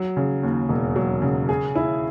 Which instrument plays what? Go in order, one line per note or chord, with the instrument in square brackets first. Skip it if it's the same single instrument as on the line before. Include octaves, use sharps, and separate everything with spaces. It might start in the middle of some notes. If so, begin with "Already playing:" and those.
Already playing: [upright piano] F#3
C#3
D#2
E1
F#3
C#3
G#4
E4